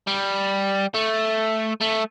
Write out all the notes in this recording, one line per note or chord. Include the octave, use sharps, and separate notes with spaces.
G3
A3
A3